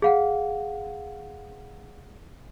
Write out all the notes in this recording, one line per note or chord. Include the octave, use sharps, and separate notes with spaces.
G#4 F5 F#5